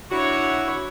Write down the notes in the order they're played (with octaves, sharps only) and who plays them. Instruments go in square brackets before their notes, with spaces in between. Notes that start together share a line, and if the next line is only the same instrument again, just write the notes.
[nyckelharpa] D4 C#5 [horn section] E4 F#4